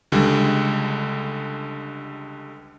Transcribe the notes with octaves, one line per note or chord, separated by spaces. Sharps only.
C#2 D3 G3 G#3